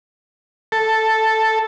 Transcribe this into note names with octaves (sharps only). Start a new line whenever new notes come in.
A4